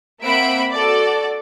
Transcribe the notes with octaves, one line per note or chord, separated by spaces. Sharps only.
A#3 C4 E5 F#5 B5 D7
F#4 A4 D5